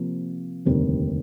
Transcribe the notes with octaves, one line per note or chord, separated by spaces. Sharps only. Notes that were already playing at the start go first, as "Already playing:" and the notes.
Already playing: C3 F3 A#3
F1 D#2 D3 G3 C4